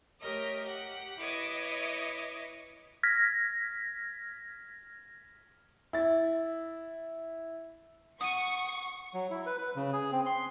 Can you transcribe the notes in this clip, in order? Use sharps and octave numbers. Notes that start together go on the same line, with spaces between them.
A3 G4 A#4 C#5 D#5
G4 F#5
E4 B4 C#5 D#5 D6 D#6
F6 G#6 A#6 B6
E4 A6
F#5 C#6 D#6 D#7
F#3
E4
B4
B4
C#3
G#4
C4
C6